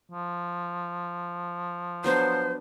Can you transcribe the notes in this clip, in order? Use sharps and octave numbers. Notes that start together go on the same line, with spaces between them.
F3
F#3 B3 D4 C5